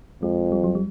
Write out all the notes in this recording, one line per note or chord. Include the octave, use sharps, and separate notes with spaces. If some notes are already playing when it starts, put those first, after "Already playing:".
F2 G#3
G3
F#3
G3